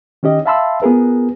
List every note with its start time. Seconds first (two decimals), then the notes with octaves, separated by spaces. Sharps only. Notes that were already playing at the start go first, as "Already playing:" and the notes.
0.23 D#3 C#4 G4 D#5
0.46 E5 F5 A5 B5 C6 E6
0.82 B3 F4 G#4 A#4 B4